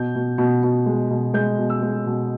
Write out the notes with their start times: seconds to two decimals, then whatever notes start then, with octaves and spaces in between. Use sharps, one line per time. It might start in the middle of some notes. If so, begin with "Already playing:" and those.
Already playing: B2 G6
0.15 B2
0.38 B2
0.63 B2
0.86 G#3
1.10 B2
1.34 G#3 G6
1.58 B2
1.70 E6
1.82 G#3
2.06 B2